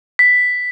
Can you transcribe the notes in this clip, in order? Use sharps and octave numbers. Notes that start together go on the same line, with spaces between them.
B6